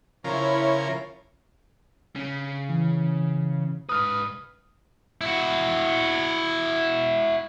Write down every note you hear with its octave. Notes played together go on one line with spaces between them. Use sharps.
C#3 F3 E4 A#4 C#5
C#3
E3
G#2 B4 D#6 F6
E4 F#4